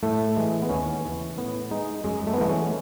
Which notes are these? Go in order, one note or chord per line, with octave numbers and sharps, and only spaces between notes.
A2 A3
E3 G#3
B3
D#2 C#4
C#3 E3 G#3
A2 B3
G#3 D#4
F#2 G#3
A3
B3
E3 G#3 A3
C#4